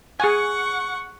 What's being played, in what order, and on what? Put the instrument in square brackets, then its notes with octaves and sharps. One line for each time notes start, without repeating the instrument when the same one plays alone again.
[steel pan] G#4 G#5 [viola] F#5 C#6